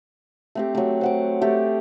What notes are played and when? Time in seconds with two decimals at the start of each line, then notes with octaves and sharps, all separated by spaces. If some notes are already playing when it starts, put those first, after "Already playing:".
0.55 A3 C4 G4
0.75 F#3 A3
1.01 C5 F#5 D6
1.42 A3 G4